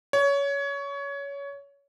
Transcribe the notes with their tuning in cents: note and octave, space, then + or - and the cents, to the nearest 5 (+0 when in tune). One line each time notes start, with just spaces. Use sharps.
C#5 +20